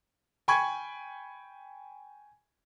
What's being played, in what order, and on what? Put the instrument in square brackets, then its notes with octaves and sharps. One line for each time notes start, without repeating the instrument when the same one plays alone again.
[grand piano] G5 G#5 B5 C#6 G#6